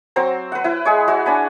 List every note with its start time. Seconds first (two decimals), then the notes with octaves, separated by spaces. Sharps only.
0.16 F#3 C4 C5 A#5
0.52 B4 F#5
0.64 E4 B4
0.85 G#3 G#4 C#5
1.08 F#4 C#5 E5
1.26 D4 G#5 B5